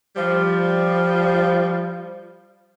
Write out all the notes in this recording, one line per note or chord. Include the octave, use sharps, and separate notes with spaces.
F3 G3